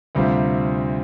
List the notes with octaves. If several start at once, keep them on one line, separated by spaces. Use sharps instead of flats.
D2 C3 G3 C4 F4